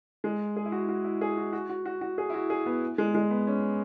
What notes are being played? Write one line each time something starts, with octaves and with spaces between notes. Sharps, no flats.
G#3
G#4
E4
F#4
F#4
E4
G#4
F#4
F#4
F#4
F#4
F#4
G#4
E4
F#4
G#4
B3
G#3
G#3
B3
C#4